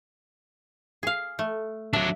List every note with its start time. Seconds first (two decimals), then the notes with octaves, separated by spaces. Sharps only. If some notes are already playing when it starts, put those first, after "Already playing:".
1.03 G#4 F5
1.39 A3
1.93 F#3 D4 E5